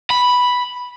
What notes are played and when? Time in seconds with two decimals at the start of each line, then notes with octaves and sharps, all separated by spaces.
0.10 B5